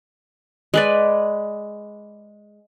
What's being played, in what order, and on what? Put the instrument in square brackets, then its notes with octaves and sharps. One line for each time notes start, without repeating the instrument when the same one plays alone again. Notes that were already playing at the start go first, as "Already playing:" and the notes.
[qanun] G#3 B4 D5